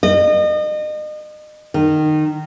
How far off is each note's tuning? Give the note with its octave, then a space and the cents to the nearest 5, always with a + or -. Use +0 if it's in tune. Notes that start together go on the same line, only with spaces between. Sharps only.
D#5 -35
D#3 -20